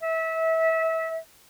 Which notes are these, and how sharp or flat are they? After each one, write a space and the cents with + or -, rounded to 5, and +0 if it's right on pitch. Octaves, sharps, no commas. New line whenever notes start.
E5 -25